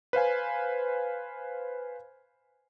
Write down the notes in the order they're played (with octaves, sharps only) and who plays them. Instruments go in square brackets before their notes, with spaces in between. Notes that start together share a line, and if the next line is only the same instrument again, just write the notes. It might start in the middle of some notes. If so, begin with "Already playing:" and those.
[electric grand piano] B4 C5 F5 G#5